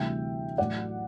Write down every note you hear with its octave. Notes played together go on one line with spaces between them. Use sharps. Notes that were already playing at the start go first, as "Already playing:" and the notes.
Already playing: D2 C3 E3 G3 E5 G5
A1 A2 F#3 D5 F#5